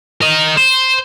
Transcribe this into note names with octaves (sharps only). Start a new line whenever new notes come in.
A#4 D#5
C5